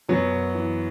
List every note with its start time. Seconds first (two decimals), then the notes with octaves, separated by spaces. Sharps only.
0.09 F#2 F#3 B3
0.31 F#2
0.55 E3